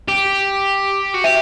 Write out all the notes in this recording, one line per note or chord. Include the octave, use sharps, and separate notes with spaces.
G4
F#4
G4 E5